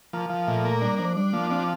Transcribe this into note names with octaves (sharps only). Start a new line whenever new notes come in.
F3 A#3
F3
A#2 A3
A#3
G3 D4
F3 D4
G3 D4
F3 A#3
C4 D4